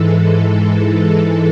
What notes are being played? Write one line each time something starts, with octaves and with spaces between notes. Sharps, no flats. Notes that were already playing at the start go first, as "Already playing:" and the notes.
Already playing: G#2 E3 G#3 A4
A4